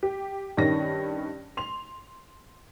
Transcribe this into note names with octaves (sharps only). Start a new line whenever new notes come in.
G4
G2 D#3 C#4 A#6
C6 F7